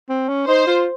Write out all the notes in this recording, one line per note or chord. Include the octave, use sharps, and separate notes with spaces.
C4
C#4
D#4 C5
F4